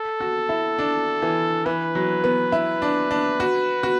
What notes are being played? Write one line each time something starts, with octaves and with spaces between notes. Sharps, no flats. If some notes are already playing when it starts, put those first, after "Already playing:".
Already playing: A4
F#4
E4
D4
E3
E3 B4
F#3
B3
E4
D4
D4
F#4
F#4